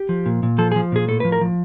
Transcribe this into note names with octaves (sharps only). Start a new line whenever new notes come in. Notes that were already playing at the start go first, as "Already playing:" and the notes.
Already playing: G4
F3
A#2
A#2
F3 A4
G#4
F3
A#2 G#4
A2 A4
B4
F3
A#4
F3